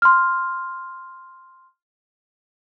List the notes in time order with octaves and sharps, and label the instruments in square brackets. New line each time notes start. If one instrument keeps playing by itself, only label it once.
[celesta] C6 F6